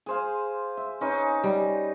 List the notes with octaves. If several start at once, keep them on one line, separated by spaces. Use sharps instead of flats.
G#4 C5 F5
E5
C#4 D#4 B4
G3